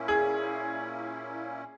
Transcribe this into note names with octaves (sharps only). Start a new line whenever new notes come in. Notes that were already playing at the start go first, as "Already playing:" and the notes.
Already playing: A#2 A#3 C#4 E4
G#4